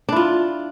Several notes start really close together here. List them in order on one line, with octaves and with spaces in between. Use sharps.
D4 E4 F4